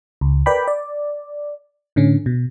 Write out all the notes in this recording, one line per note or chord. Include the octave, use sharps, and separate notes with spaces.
C#2
A#4 B4 D5 G5 B5
D5
A2 D3 C#4
B2